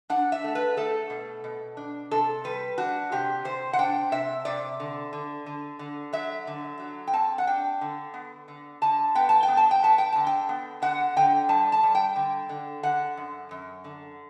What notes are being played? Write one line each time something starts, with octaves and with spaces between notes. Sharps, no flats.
D4 F#5
E5
A3
B4
A3 A4
B2
B2
D4
C3 A4
G3 B4
D4 F#4
C3 G4
C3 C5
F#5
D4 G5
C3 E5
C3 D5
D3
D3
D3
D3
F#3 E5
D3
F#3
G5
C4 A5
F#5
D4 G5
D3
B3
D3
D3 A5
B3 G5
A5
G5
B3
A5
G5
B3 A5
G5
D3 A5
G5
B3
D3 F#5
D3 G5
G3 A5
A5
G3
G5
D3
D3
D3 F#5
F#2
F#2
D3